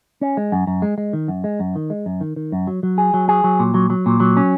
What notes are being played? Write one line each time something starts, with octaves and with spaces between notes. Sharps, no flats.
C#4
G#3
F#2
F#2
G#3
G#3
D#3
F#2
G#3
F#2
D#3
G#3
F#2
D#3
D#3
F#2
F#3
F#3
G#4
F#3
G#4
F#3
A#2
F#3
F#3
A#2
F#3
C#4